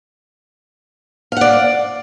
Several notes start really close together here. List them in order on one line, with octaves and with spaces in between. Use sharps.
F5 F#5 D5